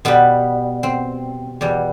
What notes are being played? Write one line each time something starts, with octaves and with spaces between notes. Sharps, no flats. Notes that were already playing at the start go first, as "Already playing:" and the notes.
B2 G3 B3
C4
E2 B2 G3